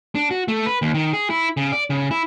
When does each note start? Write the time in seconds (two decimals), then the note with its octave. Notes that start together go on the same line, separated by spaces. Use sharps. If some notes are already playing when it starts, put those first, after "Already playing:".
0.15 D4
0.31 F#4
0.48 A3
0.66 B4
0.82 D#2
0.94 D#3
1.13 G#4
1.30 E4
1.57 C#3
1.72 D5
1.90 C#3
2.11 E4